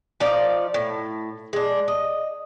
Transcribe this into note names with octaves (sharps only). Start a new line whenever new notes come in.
F3 D#4 D5 F5
A2
G#3 D4
D#5